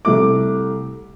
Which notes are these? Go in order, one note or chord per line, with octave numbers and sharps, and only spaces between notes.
C2 A3 D6